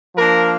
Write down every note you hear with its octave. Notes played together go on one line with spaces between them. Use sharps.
F3 A#3 D4 A#4